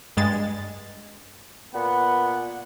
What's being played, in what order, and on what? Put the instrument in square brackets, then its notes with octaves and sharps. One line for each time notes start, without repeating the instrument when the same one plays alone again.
[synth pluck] G2 G#3 A6
[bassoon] A#2 [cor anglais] B3 [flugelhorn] F#5